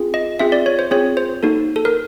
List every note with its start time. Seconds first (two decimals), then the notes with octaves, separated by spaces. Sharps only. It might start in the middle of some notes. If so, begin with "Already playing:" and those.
Already playing: C4 F4 G#4
0.14 D#5
0.39 C4 F4 G#4 E5
0.52 D5
0.66 C#5
0.79 C5
0.91 C4 F4 G#4 C#5
1.17 C5
1.43 A#3 D#4 F#4 A4
1.76 A4
1.85 A#4